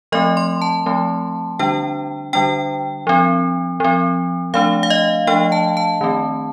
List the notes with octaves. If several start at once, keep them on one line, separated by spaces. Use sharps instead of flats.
F3 A3 C4 D#5
C6
A5
F3 A3 C4
D3 G3 D4 G5
D3 G3 D4 G5
F3 C4
F3 C4
F3 A3 D4 F5
F5
D#5
F3 A3 D4 G5
A5
A5
D#3 A3 C4